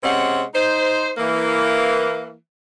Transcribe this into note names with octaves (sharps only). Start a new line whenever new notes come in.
C3 G#3 C4 C#4 F#5
D#4 C5
E3 A#3